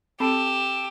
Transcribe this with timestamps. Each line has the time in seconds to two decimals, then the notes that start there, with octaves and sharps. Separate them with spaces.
0.20 C4 G4 A4 E7